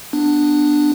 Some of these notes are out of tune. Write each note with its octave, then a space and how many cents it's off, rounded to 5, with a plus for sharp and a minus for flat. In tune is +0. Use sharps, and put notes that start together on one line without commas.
B3 +0 D4 +10